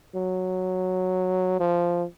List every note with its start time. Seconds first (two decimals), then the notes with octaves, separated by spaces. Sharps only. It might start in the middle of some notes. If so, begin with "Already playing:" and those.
0.15 F#3
1.60 F3